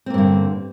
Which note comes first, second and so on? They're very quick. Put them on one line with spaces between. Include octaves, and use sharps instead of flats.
C4 A#3 G2 D3